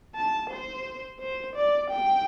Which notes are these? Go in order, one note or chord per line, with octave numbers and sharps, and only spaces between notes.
A5
C5
C5
D5
G5